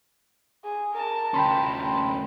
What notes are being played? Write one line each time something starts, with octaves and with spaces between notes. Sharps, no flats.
G#4
A#4 A5
D2 C#4 G5 B5 C6